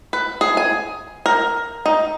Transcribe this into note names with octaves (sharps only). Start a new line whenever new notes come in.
B4
G#4
G#5
A#4
D#4